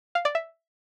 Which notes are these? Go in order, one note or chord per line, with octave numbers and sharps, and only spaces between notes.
F5
D5
E5